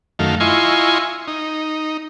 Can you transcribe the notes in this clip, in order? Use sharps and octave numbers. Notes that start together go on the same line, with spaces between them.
F#2 D#3 A3 F5
E4 F4 D#5 G#5 C6 C#6
D#4